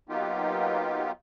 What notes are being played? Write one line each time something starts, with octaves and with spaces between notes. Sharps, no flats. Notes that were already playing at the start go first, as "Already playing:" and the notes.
F#3 A#3 B3 D#4 F4 G4